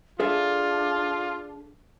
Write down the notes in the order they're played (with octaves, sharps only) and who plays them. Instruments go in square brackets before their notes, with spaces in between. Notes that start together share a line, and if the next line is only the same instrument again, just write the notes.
[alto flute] D4 [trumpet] F4 [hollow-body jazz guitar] G#4 A4 E5